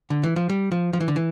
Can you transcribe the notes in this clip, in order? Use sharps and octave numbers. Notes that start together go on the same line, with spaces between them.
D3
E3
F3
G3
F3
F3
E3
D3
E3